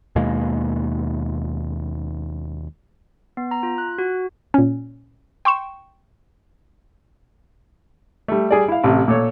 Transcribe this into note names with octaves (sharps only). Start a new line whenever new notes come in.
D#2 B2 G#3 A#3
B3
A#5
F4
F#6
F#4
A#2 C#4
G5 C6 C#6 E7
G3 A3
G3 G#4 D5
E4 F5
A1 C3
A#2 A4 C#5